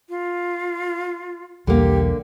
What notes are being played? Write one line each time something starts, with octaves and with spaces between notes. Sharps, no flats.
F4
B1 E2 D3 G3 A#3 G4